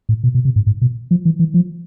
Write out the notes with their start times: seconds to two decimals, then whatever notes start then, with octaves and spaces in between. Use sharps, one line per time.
0.09 A2
0.24 B2
0.35 B2
0.45 C3
0.56 G#2
0.67 G#2
0.82 B2
1.11 F3
1.25 E3
1.39 E3
1.54 F3